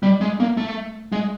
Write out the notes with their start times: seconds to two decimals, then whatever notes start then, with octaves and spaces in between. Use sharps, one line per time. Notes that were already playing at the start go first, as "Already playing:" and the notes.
0.03 G3
0.21 G#3
0.40 A#3
0.57 A3
1.12 G#3